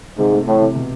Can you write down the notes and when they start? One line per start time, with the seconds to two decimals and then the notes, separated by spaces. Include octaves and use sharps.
0.18 G#2 C3
0.32 A3
0.47 A2 E3
0.61 C3
0.76 B2